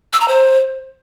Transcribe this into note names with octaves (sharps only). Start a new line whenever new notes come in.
E6
A#5
C5